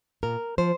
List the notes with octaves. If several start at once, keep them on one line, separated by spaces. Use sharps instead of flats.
A#2 A#4
F3 C5